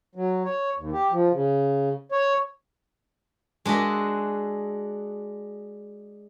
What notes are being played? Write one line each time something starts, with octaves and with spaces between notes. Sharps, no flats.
F#3
C#5
D#2
G4
F3
C#3
C#5
G#3 D4 F#4 D#5 E5